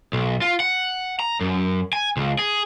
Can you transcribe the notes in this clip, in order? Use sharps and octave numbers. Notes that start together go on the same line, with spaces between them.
B1
F4
F#5
A#5
F#2
G#5
C#2
G#4